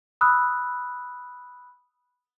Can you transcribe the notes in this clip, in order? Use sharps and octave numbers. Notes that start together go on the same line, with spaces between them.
B5 D#6 E6 F#6